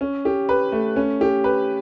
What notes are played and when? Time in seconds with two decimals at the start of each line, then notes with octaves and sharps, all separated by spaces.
0.01 C#4
0.25 G4
0.49 B4
0.72 A3
0.96 C#4
1.21 G4
1.44 B4